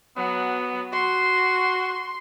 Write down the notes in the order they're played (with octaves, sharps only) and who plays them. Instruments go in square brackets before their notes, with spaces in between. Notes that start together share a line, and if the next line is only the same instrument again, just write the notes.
[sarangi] F#3 [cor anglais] B3
[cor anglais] F#4 [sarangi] C6